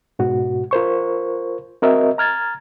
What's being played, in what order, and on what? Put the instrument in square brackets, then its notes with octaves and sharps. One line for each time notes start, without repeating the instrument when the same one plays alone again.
[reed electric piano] G#2 B2 F#4
F4 A#4 C5 C#6
C4 F#4 A#4 D#5 E5
A#5 F6 G#6 A6